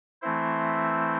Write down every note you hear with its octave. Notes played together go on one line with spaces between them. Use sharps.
E3 A3 C4 E4 C5 E5